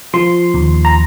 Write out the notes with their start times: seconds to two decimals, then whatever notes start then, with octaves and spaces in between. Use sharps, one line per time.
0.14 F3 C6
0.54 D#2
0.85 A#5